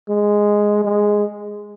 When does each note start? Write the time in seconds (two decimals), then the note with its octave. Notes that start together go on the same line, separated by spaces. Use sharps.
0.09 G#3
0.84 G#3